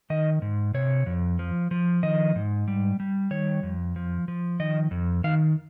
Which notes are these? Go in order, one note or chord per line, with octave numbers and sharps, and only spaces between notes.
D#3 D#5
G#2
C3 C#5
F2
F3
F3
D#3 D#5
G#2
G3
G3
D#3 C#5
F2
F3
F3
D#3 D#5
F2
D#3 F5